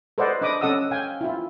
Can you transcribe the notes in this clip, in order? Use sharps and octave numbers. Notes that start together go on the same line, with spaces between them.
A4 B4 C5 D5 D#5 F#5
D4 D#5 B5 D6 D#6
C#4 A4 D#5 F#5 D#6 E6
F5 G5 G#5
E4 F4